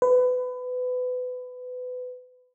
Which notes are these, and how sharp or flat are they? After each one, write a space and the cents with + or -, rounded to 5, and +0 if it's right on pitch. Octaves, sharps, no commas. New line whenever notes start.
B4 +25